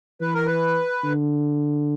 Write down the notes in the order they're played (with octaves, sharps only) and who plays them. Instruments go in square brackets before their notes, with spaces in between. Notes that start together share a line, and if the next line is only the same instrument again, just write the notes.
[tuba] E3 [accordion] B4
[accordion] A#4
B4
[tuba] D3